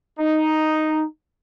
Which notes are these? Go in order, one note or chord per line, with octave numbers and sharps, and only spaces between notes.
D#4